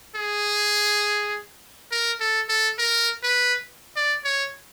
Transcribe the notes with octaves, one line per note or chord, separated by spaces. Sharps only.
G#4
A#4
A4
A4
A#4
B4
D5
C#5